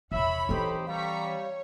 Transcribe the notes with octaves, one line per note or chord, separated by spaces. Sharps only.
E2 C3 C#5 E5 B5
E3 C4 D#4 G4 A4 C5
G3 F5 A#5 C#6 B6
C#5